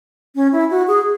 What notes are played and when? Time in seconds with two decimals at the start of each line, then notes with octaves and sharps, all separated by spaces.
0.35 C#4
0.52 E4
0.70 F#4
0.88 G#4